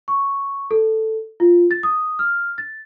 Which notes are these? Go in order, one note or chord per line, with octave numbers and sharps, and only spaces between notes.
C#6
A4
F4
A6
D#6
F6
A6